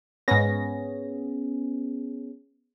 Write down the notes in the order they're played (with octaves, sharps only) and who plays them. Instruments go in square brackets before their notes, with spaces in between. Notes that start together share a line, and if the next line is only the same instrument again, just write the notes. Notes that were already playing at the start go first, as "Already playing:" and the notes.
[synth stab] G#2 A#6 [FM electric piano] B3 C#4 G#4